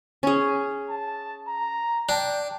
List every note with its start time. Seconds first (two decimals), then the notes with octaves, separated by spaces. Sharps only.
0.23 C#4 G#4
0.89 A5
1.47 A#5
2.09 D4 G5